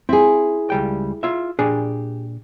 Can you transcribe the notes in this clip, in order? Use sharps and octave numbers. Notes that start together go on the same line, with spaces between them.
C4 E4 G#4
C#2 G3 G5
F4 E5
A#2 D4 G4 G#4